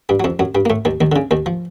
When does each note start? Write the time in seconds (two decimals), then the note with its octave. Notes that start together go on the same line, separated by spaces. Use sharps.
0.09 G2 G3
0.20 F#3
0.24 F2 F3
0.39 F#2 F#3
0.55 G2 G3
0.65 A#3
0.70 A2 A3
0.85 D#2 D#3
1.01 D#2 D#3
1.12 D3
1.16 C#3
1.31 D#2 D#3
1.46 F3